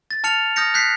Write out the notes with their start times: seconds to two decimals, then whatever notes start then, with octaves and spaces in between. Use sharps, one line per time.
0.11 A6
0.24 A5 F6 C#7 F7
0.56 D#6 F6 G6 A#6 C#7
0.74 F#6 G6 B6 C7